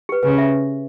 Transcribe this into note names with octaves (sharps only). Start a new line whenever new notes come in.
G4 B4
C#3 B4
E5